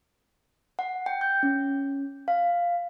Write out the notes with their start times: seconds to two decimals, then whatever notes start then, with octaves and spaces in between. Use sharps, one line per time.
0.79 F#5
1.06 G5
1.21 G6
1.43 C#4
2.28 F5